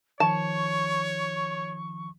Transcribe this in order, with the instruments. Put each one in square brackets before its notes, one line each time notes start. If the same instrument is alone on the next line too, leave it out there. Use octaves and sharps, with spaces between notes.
[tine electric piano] D#3 F3 [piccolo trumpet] C#5 [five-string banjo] A5 [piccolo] C#6